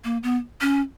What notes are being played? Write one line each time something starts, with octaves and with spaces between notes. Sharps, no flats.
A#3
B3
C#4